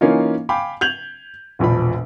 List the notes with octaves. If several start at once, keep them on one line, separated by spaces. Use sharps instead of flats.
E3 A#3 C#4 D#4 F4
F5 G5 G#5 B5 D6
G6 G#6 F7 F#7
E1 A#1 F3 B5